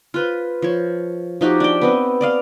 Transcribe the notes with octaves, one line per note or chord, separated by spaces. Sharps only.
F4 B4 C5
F3 C#5
F3 D#4 F#4 G4
D4 G5
B3 C4 D#5
D5 D#5 F5